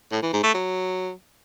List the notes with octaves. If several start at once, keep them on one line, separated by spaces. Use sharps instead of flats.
A2
E3
G#2
A3
F#3